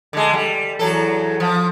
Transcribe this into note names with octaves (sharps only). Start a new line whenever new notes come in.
D3 G#3
G3
E2 F#3 A4
F3